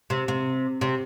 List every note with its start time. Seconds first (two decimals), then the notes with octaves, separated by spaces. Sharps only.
0.10 C3
0.28 C3
0.81 C3